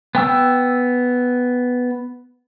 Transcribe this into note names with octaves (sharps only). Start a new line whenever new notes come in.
B3 G5 E6